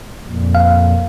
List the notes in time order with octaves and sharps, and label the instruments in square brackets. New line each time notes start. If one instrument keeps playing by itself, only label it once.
[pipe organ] F2 A#2
[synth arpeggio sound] F5